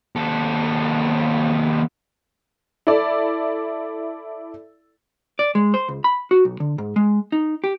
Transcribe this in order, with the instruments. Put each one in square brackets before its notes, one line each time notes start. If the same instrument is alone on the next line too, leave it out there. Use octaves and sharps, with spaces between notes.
[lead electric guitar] D#2 A4
[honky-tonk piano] E4 A4 D5
[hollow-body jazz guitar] D5
G#3
C5
C#2
B5
F#4
B1
D3
G#2
G#3
D#4
G4